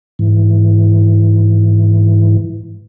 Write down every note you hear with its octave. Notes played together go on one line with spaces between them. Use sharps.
G#2 E3